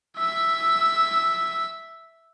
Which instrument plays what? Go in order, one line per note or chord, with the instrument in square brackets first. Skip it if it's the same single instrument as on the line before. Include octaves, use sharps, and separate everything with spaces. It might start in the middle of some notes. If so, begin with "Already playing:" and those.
[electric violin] E5 E6